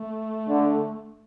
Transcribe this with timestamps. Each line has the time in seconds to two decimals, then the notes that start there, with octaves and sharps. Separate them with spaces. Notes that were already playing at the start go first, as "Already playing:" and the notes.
Already playing: A3
0.48 D3